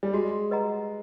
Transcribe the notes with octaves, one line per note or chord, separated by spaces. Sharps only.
G3
G#3 F#4
B4 D#5 F#5 A#5